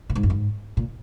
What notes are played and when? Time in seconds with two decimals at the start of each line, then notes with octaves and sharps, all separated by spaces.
0.10 A#2
0.15 G#2
0.23 F#2
0.30 G#2
0.77 A#2